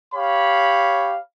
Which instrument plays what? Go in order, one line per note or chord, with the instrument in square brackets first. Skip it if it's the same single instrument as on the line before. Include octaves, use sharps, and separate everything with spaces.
[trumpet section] G4 C#5 F5 B5